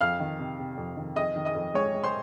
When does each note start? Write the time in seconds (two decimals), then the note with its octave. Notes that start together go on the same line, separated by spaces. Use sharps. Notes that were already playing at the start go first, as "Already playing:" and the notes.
0.01 F2 F5 F6
0.20 D#3
0.39 C3
0.59 C3
0.77 F2
0.97 D#3
1.16 F2 D#5 D#6
1.36 D#3
1.45 D#5 D#6
1.55 F2
1.74 G#3 C#5 C#6
1.94 G#3
2.04 C5 C6